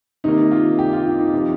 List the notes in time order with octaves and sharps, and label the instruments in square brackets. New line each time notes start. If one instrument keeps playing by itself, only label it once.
[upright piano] C3 D#3 A#3 D#4
F4
G4
F4
D#4
D#4
C3 F3 C4